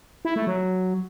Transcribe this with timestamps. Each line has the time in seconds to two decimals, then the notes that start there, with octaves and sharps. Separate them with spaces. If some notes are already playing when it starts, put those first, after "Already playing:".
0.25 E4
0.36 A3
0.47 F#3